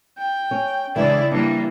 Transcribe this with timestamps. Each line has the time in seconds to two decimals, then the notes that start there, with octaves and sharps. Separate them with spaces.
0.18 G5
0.51 C#4
0.96 C#3 E3 G#3 D4 E4 D5
1.32 E3 G3 A#3 D4